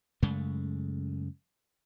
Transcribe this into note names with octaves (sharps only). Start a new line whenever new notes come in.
F#2 C#3 G#3 A3